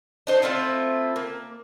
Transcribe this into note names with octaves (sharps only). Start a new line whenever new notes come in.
D4 D#4 C5
A3 C4 E4 F4
A#3